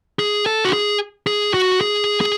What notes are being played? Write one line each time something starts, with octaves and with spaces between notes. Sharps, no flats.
G#4
A4
F#4
G#4
G#4
F#4
G#4
G#4